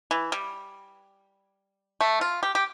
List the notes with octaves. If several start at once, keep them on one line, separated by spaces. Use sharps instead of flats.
E3
G3
A3
F4
G4
G4